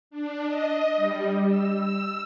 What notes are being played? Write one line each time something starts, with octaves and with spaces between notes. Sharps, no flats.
D4
D#5
G3
E6
E6